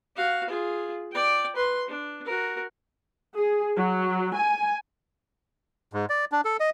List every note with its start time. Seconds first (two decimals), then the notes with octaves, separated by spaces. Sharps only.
0.16 F#4 F5
0.49 F4 G#4
1.12 D5 G5
1.56 B4 C6
1.88 D4
2.25 F#4 A#4
3.36 G#4
3.77 F#3
4.36 G#5
5.93 G#2
6.10 D5
6.32 D4
6.45 A4
6.60 D#5